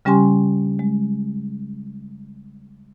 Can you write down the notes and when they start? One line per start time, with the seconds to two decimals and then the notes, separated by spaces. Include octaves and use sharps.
0.05 C#3 G3 C#4 G4 G#5 C6
0.79 G#3